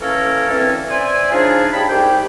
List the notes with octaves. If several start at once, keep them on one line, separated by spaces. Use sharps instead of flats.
E3 A#3 C#4 A4 A#4 C#5
D2 E3 C4 C#4 A4 C#5
C5 D5 E5 G#5
C#3 F3 D4 D#4 F4 G#4
F3 G3 G#4 A5 B5
C2 G#2 G4 G5